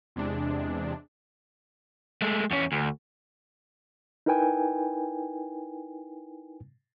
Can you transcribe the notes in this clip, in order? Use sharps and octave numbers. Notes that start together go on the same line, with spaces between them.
E2 C3 G#3 D4
G#3 A3
E2 C#4
D2
D#4 E4 A#4 B4 G5 G#5